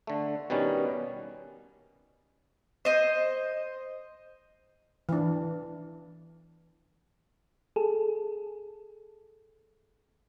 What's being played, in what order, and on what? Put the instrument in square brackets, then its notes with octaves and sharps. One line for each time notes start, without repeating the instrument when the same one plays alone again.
[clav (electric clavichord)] D3 A3
B2 D#3 G3 B3 C#4
[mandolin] C5 D#5
[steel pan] E3 D4
[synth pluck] G#4 A4